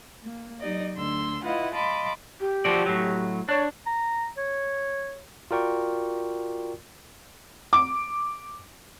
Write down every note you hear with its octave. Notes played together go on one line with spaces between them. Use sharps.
A#3
F#3 D#4 G4 D5 D#5
D2 D3 C6 E6
E4 F4 B4 D#5 F5 F#5
D#5 F5 A5 B5 C6 D6
G4
F3 F#4 D5
A2 F#3
D4 C#5
A#5
C#5
F4 F#4 A#4 D5 G5 C#6
D6